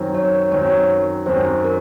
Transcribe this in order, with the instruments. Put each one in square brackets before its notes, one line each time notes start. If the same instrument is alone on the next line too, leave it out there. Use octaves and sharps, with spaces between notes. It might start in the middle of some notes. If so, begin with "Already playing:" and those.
Already playing: [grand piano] F#2 D#3 F#3 C4
[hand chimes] C#5
[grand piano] F#2 D#3 F#3 C4 [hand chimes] C#5
[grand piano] F#2 D#3 F#3 C4 [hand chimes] C5
[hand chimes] A#4